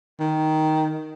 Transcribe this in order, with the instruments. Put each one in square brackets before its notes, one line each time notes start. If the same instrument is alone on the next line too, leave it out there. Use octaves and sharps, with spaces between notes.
[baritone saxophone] D#3